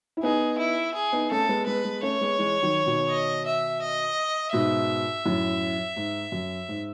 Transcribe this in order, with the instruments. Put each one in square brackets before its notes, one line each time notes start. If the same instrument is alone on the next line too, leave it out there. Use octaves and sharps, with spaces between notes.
[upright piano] E4
[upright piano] B3 D#4 [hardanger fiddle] G#4
[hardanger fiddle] E4
G#4
[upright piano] B3 D#4
[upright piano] A3 C#4 [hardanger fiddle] A4
[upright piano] G#3 B3
[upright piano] G#3 B3 [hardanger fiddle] B4
[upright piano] G#3 B3
[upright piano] A3 C#4 [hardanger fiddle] C#5
[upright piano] G#3 B3
E3 G#3
D#3 F#3
B2 D#3
[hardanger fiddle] D#5
E5
D#5
[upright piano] G#2 B2 [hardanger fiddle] E5
[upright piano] F#2 A2
G#2
F#2
G#2